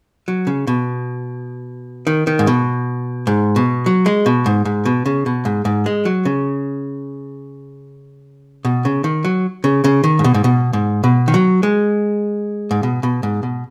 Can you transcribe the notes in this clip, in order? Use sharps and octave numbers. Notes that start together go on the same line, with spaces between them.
F#3
C#3
B2
D#3
D#3
G#2
B2
G#2
B2
F#3
G#3
B2
G#2
G#2
B2
C#3
B2
G#2
G#2
G#3
F#3
C#3
B2
C#3
D#3
F#3
C#3
C#3
D#3
G#2
B2
G#2
B2
G#2
B2
D#3
F#3
G#3
G#2
B2
B2
G#2
B2